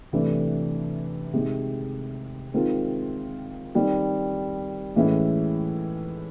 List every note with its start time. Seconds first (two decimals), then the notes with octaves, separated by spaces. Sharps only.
0.13 C3 E3 A3 D4
1.33 C3 D#3 G#3
2.54 D#3 G#3 C4 F4 A#4
3.75 D#3 G3 C4
4.95 A2 E3 G#3 C#4 E4